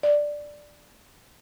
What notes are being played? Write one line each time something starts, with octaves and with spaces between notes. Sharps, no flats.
D5